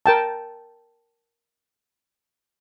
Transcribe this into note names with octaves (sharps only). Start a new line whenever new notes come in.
A#4 G5 A5